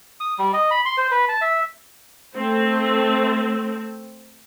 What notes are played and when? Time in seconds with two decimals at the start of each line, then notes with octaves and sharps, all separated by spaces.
0.20 D#6
0.39 G3
0.53 D#5
0.71 B5
0.86 C6
0.97 C5
1.11 B4
1.28 A5
1.41 E5
2.36 A3 C4